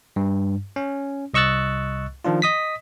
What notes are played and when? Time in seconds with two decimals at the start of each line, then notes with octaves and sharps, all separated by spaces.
0.16 G2
0.76 C#4
1.34 C2 D#5 C#6 E6 F#6 A6
2.25 D#3 F3 D4 F4
2.42 D#5 D#6 B6